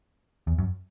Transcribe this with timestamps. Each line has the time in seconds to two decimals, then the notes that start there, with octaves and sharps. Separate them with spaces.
0.47 E2
0.58 F#2